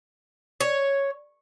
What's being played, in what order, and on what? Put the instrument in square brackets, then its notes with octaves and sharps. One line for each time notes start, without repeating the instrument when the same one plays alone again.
[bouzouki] C#5